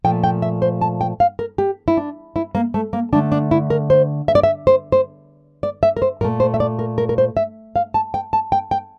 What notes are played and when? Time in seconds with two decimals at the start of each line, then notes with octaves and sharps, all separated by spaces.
0.04 A#2 F3 A3 G5
0.24 G5
0.42 E5
0.62 C5
0.81 A5
1.01 G5
1.20 F5
1.39 A#4
1.58 G4
1.88 E4
1.97 D4
2.36 E4
2.55 A#3
2.74 A3
2.93 A#3
3.12 D3 A3 D4
3.32 D4
3.51 E4
3.70 A#4
3.90 C5
4.28 E5
4.35 D5
4.43 E5
4.67 C5
4.92 C5
5.63 D5
5.83 E5
5.97 A#4
6.02 C5
6.21 A#2 A#4
6.24 A3
6.40 C5
6.54 E5
6.60 D5
6.79 A#4
6.98 A#4
7.09 A#4
7.18 C5
7.37 E5
7.76 F5
7.94 A5
8.14 G5
8.33 A5
8.52 G5
8.71 G5